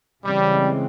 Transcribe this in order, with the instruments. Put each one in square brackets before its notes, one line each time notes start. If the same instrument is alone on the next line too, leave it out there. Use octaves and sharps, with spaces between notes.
[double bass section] C#3 E3 G#3 C4 [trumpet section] G3